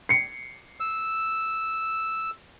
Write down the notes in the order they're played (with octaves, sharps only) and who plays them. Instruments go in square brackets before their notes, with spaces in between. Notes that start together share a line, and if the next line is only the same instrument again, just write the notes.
[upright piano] C7 C#7
[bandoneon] E6